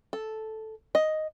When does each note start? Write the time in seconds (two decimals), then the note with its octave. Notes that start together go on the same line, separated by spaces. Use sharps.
0.13 A4
0.95 D#5